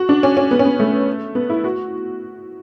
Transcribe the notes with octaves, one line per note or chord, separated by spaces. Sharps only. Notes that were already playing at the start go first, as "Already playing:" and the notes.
Already playing: F#4
D4
C#4
C#4
B3
C#4
B3
A3
B3
E4
F#4